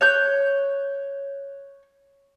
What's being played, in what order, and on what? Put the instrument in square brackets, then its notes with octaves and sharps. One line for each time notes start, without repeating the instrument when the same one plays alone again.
[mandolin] C#5 F#6 G6